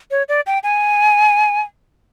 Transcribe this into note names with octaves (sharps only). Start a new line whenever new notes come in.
C#5
D5
G5
G#5